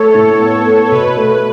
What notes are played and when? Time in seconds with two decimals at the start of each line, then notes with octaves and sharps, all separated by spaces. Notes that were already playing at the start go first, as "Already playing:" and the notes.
Already playing: A3 A4 C#5
0.15 A2
0.40 B3
0.66 B3
0.91 B2 B4
1.17 A3